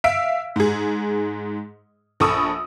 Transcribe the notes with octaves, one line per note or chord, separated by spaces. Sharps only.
E5 F5 E6 B6 D7
G#2 G#4
A#1 A4 B5 C#6 D#6 E6